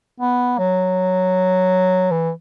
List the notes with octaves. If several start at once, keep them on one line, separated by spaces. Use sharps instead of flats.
B3
F#3
E3